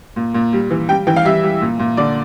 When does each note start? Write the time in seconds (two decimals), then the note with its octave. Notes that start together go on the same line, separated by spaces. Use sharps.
0.16 A#2
0.34 A#2
0.53 G3
0.70 E3
0.89 G3 G5
1.07 E3 G5
1.16 F5
1.25 G3 E5
1.43 G3
1.61 A#2
1.79 A#2
1.97 D3 D5